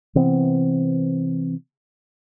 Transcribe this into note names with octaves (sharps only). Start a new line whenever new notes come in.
C3 E3 B3 C4